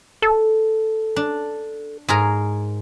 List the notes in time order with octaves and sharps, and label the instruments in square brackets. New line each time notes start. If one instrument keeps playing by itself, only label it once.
[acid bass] A4
[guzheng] D4
G#2 G#4 A#4